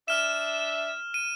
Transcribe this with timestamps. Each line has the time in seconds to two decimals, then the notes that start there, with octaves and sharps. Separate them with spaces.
0.08 D4 E5 F6 E7
1.14 D#7